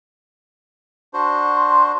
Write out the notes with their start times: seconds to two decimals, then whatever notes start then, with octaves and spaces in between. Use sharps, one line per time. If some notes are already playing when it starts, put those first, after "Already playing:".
1.14 D4 F#4 C5
1.55 C6